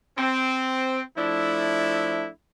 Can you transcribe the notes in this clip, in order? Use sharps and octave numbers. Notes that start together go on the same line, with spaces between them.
C4
F3 A3 D4 E4